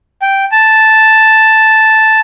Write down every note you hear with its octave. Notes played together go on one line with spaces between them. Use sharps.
G5
A5